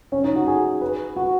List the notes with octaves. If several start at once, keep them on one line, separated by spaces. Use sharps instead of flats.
C#4
D#4
F#4
G#4
B4
F#4